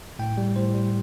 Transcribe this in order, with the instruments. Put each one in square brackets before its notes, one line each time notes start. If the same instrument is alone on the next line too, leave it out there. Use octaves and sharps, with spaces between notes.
[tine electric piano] A2 G5
G3
A2 C5
G3